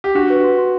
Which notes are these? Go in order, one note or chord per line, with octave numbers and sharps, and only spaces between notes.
G4
D4 F#4
B4
C6
C6